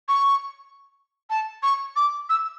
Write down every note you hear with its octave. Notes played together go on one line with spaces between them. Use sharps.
C#6
A5
C#6
D6
E6